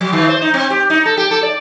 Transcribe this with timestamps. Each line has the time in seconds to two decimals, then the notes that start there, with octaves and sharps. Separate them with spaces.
0.01 F#3
0.13 D#3
0.29 C5
0.42 D#4
0.54 C4
0.70 G4
0.90 D#4
1.06 A4
1.17 G4
1.31 A4
1.43 D5